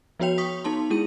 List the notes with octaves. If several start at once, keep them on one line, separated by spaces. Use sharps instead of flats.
F3 B3 F#4 C#5 G5 F7
C#6 D#6 B6
B3 D#4 A5 C6
G#3 E4 G#4 D#7